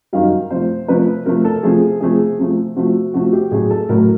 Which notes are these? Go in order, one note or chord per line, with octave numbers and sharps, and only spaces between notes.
F#2 D#3 G3 F5
C3 F3 A3 C5
C3 F3 A3 B4
C3 F3 A3 A#4
A4
C3 F3 A3 G#4
C3 F3 A3 G#4
C3 F3 A3
C3 F3 A3 F#4
C3 F3 A3 F#4
G4
A2 F#3 A3 G#4
A4
A2 F#3 A3 A#4